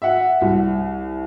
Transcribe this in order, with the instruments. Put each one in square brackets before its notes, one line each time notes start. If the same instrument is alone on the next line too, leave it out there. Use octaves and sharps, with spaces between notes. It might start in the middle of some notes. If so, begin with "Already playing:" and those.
[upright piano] E5 F#5
C2